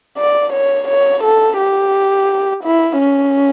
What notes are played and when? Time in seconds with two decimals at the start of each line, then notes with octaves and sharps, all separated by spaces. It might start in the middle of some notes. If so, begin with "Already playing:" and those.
0.18 D5
0.53 C#5
0.88 C#5
1.23 A4
1.59 G4
2.64 E4
2.99 C#4